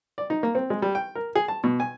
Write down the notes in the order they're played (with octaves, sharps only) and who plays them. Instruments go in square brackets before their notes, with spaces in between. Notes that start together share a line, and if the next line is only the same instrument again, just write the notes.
[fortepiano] D5
D#4
A#3
C4
G#3
G3
G5
A#4
G#4
A5
B2
G#5